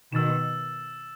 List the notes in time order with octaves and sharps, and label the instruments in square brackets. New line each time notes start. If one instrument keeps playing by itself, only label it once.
[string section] B2 D#3 [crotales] E6 A6 E7